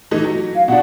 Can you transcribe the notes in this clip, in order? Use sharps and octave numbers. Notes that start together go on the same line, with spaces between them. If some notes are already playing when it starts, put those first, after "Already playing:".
E3 A3 D#4
F#3
F5
B2 D4 F#5